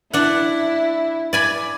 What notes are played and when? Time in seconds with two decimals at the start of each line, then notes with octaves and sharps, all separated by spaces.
0.13 D4 E4 F#5
1.33 D5 G#5 B5